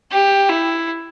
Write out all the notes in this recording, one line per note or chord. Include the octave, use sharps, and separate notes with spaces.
G4
E4